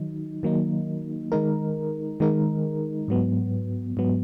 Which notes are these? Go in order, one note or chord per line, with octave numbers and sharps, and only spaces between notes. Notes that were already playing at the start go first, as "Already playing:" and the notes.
Already playing: D#3 F#3 D#4
D#3 F#3 A#3 D#4
D#3 G#3 D#4 A#4
D#3 G#3 D#4 A#4
G#2 F#3 B3
G#2 F#3 B3